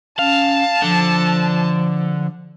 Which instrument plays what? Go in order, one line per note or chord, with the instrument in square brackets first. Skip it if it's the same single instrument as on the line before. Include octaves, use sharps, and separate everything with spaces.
[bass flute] C#4 [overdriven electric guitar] F5 [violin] A5
[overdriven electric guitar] D3 [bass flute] F3